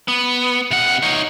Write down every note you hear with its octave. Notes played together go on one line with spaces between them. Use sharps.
B3
C3 F#5
D#4 C#5